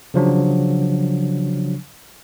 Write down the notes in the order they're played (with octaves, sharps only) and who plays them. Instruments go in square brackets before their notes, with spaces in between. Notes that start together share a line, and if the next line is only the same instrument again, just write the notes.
[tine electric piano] C#3 F3 F#3 D4